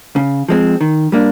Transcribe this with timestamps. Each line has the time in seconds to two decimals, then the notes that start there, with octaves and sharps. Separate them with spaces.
0.16 C#3
0.48 F3 G#3 C4
0.81 D#3
1.12 G3 A#3 D4